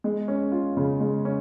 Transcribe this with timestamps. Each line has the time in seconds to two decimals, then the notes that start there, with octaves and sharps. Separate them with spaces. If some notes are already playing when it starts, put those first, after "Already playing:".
0.04 G#3
0.28 C#4
0.52 F4
0.77 C#3
1.00 G#3
1.25 C#4